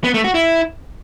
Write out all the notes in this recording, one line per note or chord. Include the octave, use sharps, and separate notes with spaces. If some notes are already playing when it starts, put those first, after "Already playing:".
B3
A3
F#4
E4